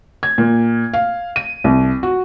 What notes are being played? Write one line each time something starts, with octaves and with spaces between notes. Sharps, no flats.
G#6
A#2
F5
D#7
C2
F#4